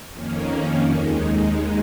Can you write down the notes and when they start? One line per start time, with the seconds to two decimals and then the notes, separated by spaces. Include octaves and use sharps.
0.12 F2 D#3 A#3 C#4
0.94 D#2 D#3 G#3